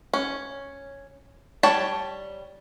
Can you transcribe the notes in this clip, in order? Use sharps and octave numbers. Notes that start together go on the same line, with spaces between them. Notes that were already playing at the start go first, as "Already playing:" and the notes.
C#4
G3 C#5 G5 A5